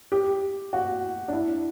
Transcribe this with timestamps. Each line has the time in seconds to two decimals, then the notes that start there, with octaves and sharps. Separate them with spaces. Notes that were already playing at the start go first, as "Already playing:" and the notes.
0.12 G4
0.73 F#4
1.28 D4
1.33 E4